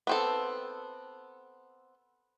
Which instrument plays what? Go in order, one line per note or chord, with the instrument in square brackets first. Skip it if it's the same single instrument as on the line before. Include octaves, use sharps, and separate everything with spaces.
[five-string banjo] B3 C4 A4